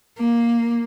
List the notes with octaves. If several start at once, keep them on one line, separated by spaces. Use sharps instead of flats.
A#3